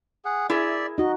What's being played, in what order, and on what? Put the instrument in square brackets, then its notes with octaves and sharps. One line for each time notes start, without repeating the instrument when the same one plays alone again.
[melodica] G#4 F#5
[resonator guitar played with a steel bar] E4 G#4 A#4 [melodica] D5 E5
[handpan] D#4 F#4 [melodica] D#5